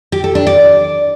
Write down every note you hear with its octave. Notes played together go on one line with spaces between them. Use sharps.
G4
A4
D4
D5